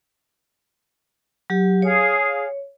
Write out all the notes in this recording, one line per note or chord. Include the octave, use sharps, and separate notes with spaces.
F#3 G4
G#4 C#5 F5